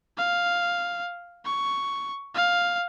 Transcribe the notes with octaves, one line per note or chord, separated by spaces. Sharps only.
F5
C#6
F5